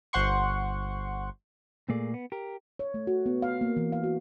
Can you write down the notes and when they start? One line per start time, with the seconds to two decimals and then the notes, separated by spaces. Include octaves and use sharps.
0.13 G1 C5 F#5 C6 C#6
1.89 A#2 A3 A#3 G#4 D5
2.14 B3
2.32 G4 A#4
2.79 C#5
2.94 A3
3.07 F#4
3.26 B3
3.42 F5
3.61 A#3
3.77 E3
3.92 F5
4.04 F#4